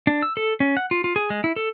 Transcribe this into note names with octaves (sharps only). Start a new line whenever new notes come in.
D4
E6
A4
C#4
F#5
F4
F4
G#4
G#3
E4
A4